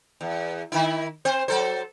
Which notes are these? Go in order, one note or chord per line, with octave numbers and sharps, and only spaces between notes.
E2
D#3 E4
C4 C5
F#3 A4 C5